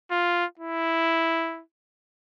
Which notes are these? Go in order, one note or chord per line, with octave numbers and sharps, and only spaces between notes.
F4
E4